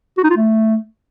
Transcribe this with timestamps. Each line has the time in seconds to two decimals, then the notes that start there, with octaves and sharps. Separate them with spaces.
0.18 F#4
0.24 D#4
0.30 F4
0.37 A3